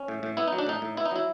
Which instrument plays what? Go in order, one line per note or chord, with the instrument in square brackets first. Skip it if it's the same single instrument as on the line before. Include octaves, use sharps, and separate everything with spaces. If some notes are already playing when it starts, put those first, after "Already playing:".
Already playing: [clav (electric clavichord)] C#4
A2
A2
B3 E4
F#3 D#4
D4
A2 D#4
A2
B3 E4
D#4
F#3 E4